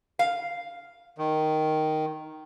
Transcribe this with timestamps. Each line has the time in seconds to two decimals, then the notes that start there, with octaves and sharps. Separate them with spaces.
0.19 F5
1.18 D#3